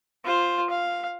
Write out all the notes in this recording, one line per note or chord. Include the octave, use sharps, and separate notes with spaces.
F4 C5
F5